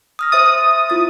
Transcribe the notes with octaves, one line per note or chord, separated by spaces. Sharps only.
D#6 F6 A#6
C5 E5 D#6 A6
E4 F4 A6